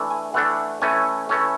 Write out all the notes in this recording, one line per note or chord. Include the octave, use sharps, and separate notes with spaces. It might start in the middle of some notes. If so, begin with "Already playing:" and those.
Already playing: E3 A3 D4
G#5
E3 A3 D4 F#5
E3 A3 C#4 G#5
E3 A3 C#4